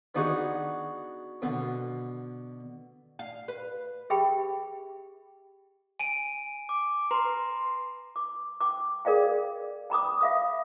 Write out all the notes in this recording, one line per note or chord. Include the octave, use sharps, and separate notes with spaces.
B3 D4 D#4 F#4 G#4 B4
B2 D3
F5
B4
G4 G#4 E5 G5 B5
G#5 D7 D#7
D6
B4 A#5 C6
D6
G5 D6
G#4 A#4 D5 F5 G5
G5 B5 D6 D#6
E5 F5 D#6